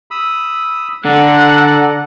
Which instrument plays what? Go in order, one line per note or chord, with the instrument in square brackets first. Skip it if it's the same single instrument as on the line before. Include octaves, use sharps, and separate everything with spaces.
[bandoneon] B5 D#6 E6
[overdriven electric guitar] D3 [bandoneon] A4 D5 A#5 [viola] F#5